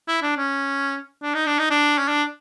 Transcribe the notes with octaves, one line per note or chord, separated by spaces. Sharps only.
E4
D4
C#4
D4
D#4
D4
D#4
D4
C#4
D4